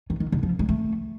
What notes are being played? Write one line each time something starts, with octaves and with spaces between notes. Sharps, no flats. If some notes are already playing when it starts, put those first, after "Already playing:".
D#3
D#3
D3
F3
G#3
A3